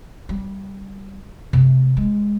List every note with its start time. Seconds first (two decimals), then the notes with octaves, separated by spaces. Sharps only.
0.29 G3
1.53 C3 A3
1.97 G#3